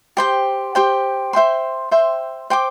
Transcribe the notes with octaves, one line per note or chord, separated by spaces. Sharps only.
G4 C5 G5
G4 C5 G5
C5 E5 G5 C6
C5 E5 G5 C6
C5 G5 D6